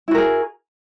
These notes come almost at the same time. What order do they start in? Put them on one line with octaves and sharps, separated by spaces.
E4 F#4 A#4 G#4